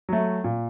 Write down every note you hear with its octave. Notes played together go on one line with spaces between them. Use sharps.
F#3 A3
A#2